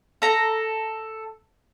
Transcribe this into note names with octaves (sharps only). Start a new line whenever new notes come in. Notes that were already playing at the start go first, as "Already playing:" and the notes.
A4 A#5